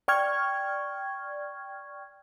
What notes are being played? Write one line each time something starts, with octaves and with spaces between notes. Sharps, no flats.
D5 G5 C#6 F6 G#6